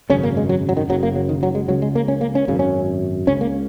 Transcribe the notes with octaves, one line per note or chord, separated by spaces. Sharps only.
G#1 F#2 C#3 C#4
A#3
G#3
F#3
F#3
D#3
F#1 F#2 C#3 F#3
A#3
F#3
D#3
F#3
G#3
C#2 C#3 F#3
G#3
A#3
C#4
A#3
C#4
G#1 F#2 C#3
C#4
C#2 C#3 C#4
A#3